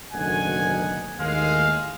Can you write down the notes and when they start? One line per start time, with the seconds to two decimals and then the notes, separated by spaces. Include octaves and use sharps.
0.13 F#1 D2 B2 D#3 F#5 G#5
1.19 D#2 A2 G#3 F5